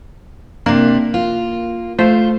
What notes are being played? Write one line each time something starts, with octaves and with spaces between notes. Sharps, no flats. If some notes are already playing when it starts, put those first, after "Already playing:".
C3 A#3 D4
F4
A3 F4 C5